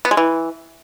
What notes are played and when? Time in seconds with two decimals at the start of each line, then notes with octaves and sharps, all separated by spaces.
0.05 B3
0.11 G#3
0.17 E3